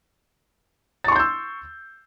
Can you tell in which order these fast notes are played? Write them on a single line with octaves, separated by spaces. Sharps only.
A6 C#6 C6 G6 E6